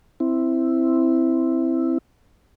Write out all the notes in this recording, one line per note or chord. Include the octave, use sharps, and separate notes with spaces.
C4 E4